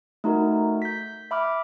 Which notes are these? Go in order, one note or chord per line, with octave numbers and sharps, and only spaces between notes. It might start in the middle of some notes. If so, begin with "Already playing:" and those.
A3 D#4 F#4 A#4
G6 B6
E5 B5 D6 F6